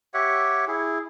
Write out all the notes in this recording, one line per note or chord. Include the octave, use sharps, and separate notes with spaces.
G4 C#5 E5 F#5
E4 G#4